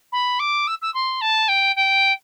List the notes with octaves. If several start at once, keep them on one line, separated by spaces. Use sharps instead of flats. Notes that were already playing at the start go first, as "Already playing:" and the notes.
B5
D6
E6
E6
C6
A5
G5
G5